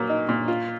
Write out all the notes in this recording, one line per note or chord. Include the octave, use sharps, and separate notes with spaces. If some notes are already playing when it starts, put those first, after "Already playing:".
Already playing: A#2 F#3 A#3
D#4
A#2
F4